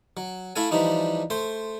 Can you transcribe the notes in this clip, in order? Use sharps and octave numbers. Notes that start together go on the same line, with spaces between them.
F#3
A3 E4 A4 F5 G#5
E3 F3 G3 D4 D#4
A3 C5 C6